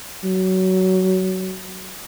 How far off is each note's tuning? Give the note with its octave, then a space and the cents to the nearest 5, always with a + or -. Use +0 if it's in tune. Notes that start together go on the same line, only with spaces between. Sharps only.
F#3 +15